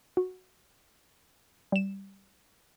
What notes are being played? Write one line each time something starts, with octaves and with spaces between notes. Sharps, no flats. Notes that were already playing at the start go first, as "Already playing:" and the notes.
F#4
G3 E7